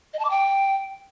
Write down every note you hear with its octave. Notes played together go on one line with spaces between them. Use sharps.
D#5
A5
D6
G5